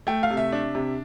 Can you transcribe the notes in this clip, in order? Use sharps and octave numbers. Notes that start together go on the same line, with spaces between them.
A3 G5
F5
C3
E5
D4
C3